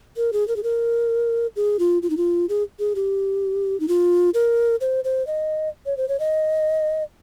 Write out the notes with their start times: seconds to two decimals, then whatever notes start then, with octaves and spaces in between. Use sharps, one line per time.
0.17 A#4
0.33 G#4
0.48 A#4
0.56 G#4
0.63 A#4
1.56 G#4
1.79 F4
2.03 F4
2.10 D#4
2.17 F4
2.49 G#4
2.79 G#4
2.95 G4
3.80 D#4
3.88 F4
4.34 A#4
4.81 C5
5.04 C5
5.27 D#5
5.86 C#5
5.97 C5
6.09 C#5
6.20 D#5